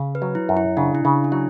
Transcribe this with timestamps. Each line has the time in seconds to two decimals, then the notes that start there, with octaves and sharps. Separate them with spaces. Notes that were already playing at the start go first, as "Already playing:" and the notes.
Already playing: C#3
0.15 B4
0.22 F#3
0.35 E4
0.49 F#2
0.57 E4
0.77 C#3 D4
0.95 E4
1.05 C#3 D4
1.24 D4
1.32 F#3 E4